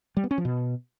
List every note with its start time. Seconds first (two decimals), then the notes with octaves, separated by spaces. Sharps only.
0.17 G3
0.24 B3
0.31 C#4
0.38 F3
0.45 B2